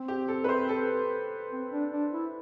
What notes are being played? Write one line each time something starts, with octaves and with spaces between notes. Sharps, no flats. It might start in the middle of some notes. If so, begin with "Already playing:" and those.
Already playing: C4
G4
A4
B4
C5
A4
C4
D4
D4
E4